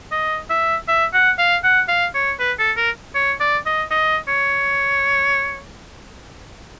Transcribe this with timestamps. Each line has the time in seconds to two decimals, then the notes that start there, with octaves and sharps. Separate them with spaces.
0.12 D#5
0.50 E5
0.88 E5
1.13 F#5
1.39 F5
1.64 F#5
1.88 F5
2.15 C#5
2.39 B4
2.59 A4
2.77 A#4
3.15 C#5
3.40 D5
3.66 D#5
3.91 D#5
4.28 C#5